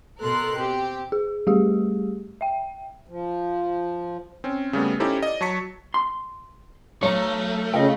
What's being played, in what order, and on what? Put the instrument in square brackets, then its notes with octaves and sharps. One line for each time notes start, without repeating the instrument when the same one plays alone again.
[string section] B2 A4 A#4 C6 F#6
C4 G4
[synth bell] G#4
G3 A3 G4 G#4
E5 G5
[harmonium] F3
[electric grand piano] C4 C#4
C#3 G3 A3 B3
C#4 D#4 E4 G4 A4 C5
D5 D#5
F#3 A5 C#6 B6 C#7
[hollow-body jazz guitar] C6
[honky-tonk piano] B1 A#5 [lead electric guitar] A3 [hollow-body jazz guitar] C#5
[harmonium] C#3 [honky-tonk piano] F4 [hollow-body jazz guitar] D#5 G5